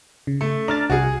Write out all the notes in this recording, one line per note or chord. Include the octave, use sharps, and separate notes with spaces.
C#3
A3
D4 A#5 F6 A6
C2 F#4 G#4